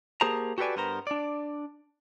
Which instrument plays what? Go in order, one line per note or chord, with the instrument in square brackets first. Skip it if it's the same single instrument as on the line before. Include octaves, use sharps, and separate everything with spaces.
[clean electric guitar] A#3 G4 G#4 C5 A5 A#5
F#4 G4 A4 B4 D5 G#5
G2 B3 A#4 C5 A#5
D4 D5